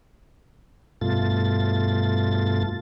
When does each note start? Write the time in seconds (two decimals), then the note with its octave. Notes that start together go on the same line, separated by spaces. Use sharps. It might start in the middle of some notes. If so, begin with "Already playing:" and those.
1.01 G2 B2 A3 F4 A6